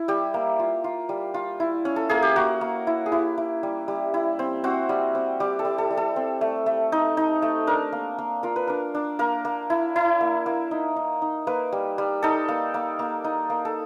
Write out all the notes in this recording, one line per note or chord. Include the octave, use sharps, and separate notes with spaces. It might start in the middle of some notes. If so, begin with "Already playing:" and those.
Already playing: E4
G3 G4
A#3
F4
F4
G3
F4
E4
C#4
A4
A#3 G#4
G4
A#3 F#4
A#3
E4
G#4
E4 G4
E4
G3
G3
E4
C4
C4 F#4
G3
C4
G3 G4
A4
G3
A4
G3
A4
C4
A3
A3
D#4
D#4
A3
D4 A#4
A#3
A#3
F4 A#4
B4
D4 A#4
D4
A#3 A#4
A#3
E4
E4
A#3
A#3
D#4
D#4
D#4
A#3 B4
G3
G3
D#4 A4
A#3
A#3
A#3
D#4
A#3
A4